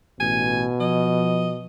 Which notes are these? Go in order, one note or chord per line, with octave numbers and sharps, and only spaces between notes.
A1 B2 G#5
F3 D#5